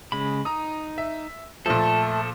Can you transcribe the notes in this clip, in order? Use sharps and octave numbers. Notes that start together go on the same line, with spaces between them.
C#3 G#3 B5
D#4 A#5 D#6
E5
A#2 F3 A3 A4